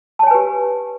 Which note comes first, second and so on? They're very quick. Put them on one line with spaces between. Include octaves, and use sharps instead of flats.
A5 C#5 G#5 B4 G4